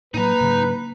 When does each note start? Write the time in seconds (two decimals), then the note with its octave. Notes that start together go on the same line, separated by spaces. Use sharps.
0.14 A2 F#3 A#3 D#4 B4 A#5
0.40 G#2 C#3 F#3